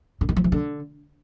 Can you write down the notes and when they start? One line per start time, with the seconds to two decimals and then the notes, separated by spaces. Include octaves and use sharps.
0.21 D3
0.29 D#3
0.37 F3
0.44 E3
0.52 D3